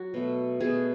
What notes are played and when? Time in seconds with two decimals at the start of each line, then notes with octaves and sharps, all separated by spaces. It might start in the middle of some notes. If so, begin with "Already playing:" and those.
Already playing: F#3 F#4
0.14 B2 A3
0.60 B2 A3 G#4